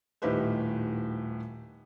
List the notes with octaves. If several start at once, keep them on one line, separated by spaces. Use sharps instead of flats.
D#1 A2 D#3 G4 B4 C5